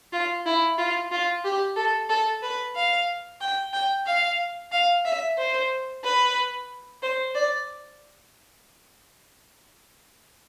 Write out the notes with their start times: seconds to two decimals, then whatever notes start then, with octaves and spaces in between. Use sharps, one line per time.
0.13 F4
0.46 E4
0.78 F4
1.11 F4
1.44 G4
1.77 A4
2.09 A4
2.43 B4
2.75 F5
3.41 G5
3.73 G5
4.06 F5
4.72 F5
5.05 E5
5.38 C5
6.04 B4
7.02 C5
7.35 D5